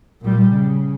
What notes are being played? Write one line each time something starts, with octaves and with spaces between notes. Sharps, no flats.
A#2 G3
C#3